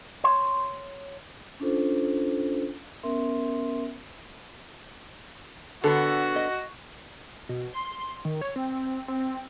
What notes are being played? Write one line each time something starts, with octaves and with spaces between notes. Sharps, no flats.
C#5 C6
C#4 D4 F4 A4 C5
B3 C#4 A#4 E5 C6
D3 B3 F#4 A4
D#5
B2
C6
D#3
C#5
C4
C4